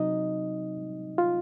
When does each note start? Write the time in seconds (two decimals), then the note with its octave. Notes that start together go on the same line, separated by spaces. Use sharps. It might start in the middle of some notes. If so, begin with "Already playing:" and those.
Already playing: C3 F#3 C4 D#4 D#5
1.18 F4